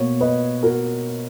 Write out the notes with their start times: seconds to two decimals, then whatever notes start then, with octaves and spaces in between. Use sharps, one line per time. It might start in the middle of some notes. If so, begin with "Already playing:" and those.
Already playing: B2 A#3 C#5
0.21 B4 D#5
0.63 F#4 A#4